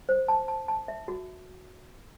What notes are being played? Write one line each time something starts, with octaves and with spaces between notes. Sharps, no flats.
C5
A5
A5
A5
E5
F#4